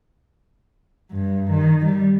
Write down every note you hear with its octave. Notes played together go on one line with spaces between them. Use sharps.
G2
D#3
G3